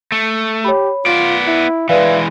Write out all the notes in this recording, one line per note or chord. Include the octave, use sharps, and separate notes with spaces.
A3
G4 C#5 B5
B3 F4 D5 D7
E4
E3 G#3 B4 D5 E5 F5